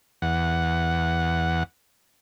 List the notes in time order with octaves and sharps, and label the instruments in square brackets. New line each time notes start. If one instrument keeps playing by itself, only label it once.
[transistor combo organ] E2 F#5